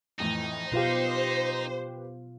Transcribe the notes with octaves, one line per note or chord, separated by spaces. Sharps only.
F2 A2 E3 D#4
B2 F4 G4 B4 C5 F5